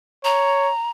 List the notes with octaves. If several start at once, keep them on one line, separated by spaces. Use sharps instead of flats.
C#5 A#5